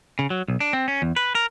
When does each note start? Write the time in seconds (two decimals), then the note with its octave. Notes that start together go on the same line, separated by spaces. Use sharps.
0.19 C#3
0.30 F#3
0.48 B1
0.60 D4
0.73 C4
0.88 C#4
1.02 E2
1.16 B4
1.35 A#4